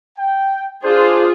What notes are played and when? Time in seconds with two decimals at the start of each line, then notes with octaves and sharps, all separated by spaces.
0.19 G5
0.84 D4 F4 G#4 C5